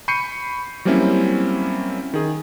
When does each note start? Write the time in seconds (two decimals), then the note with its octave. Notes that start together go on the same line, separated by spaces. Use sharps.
0.08 B5 C#6 G6 C7 C#7 D#7
0.85 F#3 G3 A#3 C4 C#4 E4
2.14 D#3 G#4